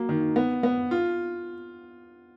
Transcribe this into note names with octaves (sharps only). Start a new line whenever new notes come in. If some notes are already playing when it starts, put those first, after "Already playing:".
Already playing: F#3 A#3
D#3
B3
B3
F4